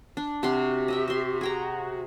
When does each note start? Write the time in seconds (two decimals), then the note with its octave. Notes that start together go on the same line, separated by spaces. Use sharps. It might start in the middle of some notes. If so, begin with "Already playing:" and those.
0.17 D4
0.43 C3 F#4 G4 C6
0.88 D#5 E5 G5
1.08 E5 C6
1.41 G#4 G5 A#5